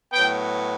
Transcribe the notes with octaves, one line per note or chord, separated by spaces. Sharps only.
A2 F#3 B3 G5